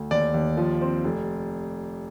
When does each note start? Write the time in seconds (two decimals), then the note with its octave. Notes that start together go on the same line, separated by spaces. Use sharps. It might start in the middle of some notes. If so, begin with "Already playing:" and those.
Already playing: D2
0.11 D#2 D5
0.34 D#2
0.57 F3
0.81 C4
1.04 F1